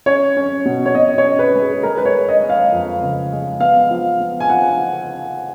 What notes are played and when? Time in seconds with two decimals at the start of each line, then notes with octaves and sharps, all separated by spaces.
0.06 C#4 C#5
0.37 C#4
0.65 B2
0.86 C#5
0.95 B2 D#5
1.18 C#5
1.24 C#4
1.39 B4
1.55 G#3
1.61 G#4
1.83 G#3 A#4
1.98 B4
2.05 C#5
2.14 G#3
2.29 D#5
2.43 G#3
2.50 F5
2.72 F2
3.01 C#3
3.32 G#3
3.60 B3 F5
3.91 F3
4.20 B3
4.40 G#5
4.49 F3 F#5